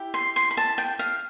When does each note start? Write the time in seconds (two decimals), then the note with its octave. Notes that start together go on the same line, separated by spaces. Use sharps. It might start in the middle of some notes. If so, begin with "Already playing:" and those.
Already playing: E4 G4
0.14 C6
0.36 C6
0.51 B5
0.57 A5
0.78 G5
0.99 F5